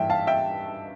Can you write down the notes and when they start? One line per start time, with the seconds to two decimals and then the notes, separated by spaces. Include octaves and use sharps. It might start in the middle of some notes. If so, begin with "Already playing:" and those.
Already playing: G2 E3 E5 G5
0.10 F5 A5
0.27 E5 G5